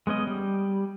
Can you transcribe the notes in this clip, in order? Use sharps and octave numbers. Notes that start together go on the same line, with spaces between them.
G#3 B3 C#4 D#5
G3